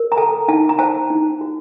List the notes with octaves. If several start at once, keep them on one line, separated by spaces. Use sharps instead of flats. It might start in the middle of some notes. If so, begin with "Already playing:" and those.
Already playing: A#4
A#5
A4 A5
D#4 A5
A#5
C5 A5
D#4
F#4